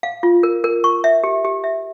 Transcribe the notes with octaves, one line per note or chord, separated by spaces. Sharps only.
F5
F4
A#4
A#4
C#6
E5
G4
G4
E5